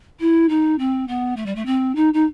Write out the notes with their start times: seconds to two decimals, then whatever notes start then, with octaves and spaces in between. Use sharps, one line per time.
0.20 E4
0.49 D#4
0.79 C4
1.08 B3
1.37 A3
1.46 G3
1.55 A3
1.66 C4
1.96 D#4
2.14 D#4